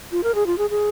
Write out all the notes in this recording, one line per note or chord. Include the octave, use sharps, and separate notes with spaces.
F4
A#4
G#4
F4
G#4
G#4